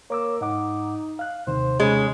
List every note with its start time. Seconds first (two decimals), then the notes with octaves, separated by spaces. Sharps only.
0.10 A#3 C#5 D6 E6
0.41 G#2 D#4 F#5 D6
1.19 F5 F#6
1.47 D#2 C3 D#3 C5
1.80 G#3 C#4